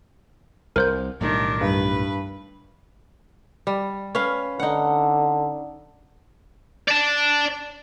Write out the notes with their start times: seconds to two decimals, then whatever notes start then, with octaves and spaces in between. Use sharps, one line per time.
0.76 C2 A#4 C5 G6
1.21 B1 A2 D#3 G3 D4
1.61 G2 B4
3.67 G3
4.15 C#4 B4 F5
4.60 D3 D#4 F#5
6.88 D5 A5